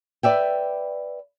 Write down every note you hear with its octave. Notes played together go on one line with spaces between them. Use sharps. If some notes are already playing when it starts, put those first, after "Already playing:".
B4 D5 E5 G5